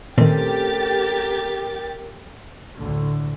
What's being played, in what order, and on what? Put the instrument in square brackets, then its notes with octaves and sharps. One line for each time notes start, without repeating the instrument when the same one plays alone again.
[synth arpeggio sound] A#2 D#3 [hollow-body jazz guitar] A3 C4 C#4 [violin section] G4 A6 [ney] A#4
[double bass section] D2 A2 D3